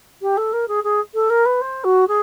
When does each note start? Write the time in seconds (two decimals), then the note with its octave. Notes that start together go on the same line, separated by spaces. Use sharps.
0.21 G4
0.37 A4
0.53 A#4
0.68 G#4
0.83 G#4
1.14 A4
1.29 A#4
1.45 B4
1.61 C5
1.84 F#4
2.07 G#4